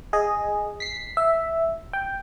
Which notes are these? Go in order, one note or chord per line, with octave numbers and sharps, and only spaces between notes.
G#4 D#5
B6 C7
E5
G5